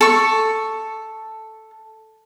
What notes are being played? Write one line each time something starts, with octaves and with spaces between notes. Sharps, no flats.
A4 C#6